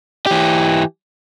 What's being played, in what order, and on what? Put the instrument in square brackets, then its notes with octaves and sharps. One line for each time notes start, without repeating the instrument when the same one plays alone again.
[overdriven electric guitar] E3 G4